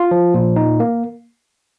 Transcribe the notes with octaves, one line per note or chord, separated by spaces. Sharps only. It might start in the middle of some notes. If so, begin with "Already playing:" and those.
Already playing: F4
F3
A#2
D#4
A#3